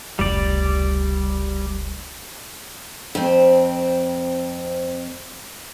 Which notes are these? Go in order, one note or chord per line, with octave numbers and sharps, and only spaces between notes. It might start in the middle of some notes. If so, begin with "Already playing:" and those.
F1 C#2 G3 D5
F2 C4